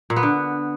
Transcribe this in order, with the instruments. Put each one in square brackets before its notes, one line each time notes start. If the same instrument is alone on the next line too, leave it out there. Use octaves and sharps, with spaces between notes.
[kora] A#2
B3
D3